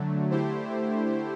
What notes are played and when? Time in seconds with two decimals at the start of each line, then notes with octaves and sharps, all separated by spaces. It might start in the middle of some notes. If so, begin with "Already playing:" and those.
Already playing: D3 F#3 A3
0.31 D3 A3 E4 G4 C5